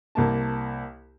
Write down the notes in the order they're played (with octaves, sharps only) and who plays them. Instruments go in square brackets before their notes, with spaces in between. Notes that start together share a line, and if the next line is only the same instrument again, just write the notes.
[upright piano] C2 A#3 A5